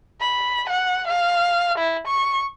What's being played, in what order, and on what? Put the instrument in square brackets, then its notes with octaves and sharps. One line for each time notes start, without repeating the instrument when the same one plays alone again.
[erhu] B5
F#5
F5
E4
C#6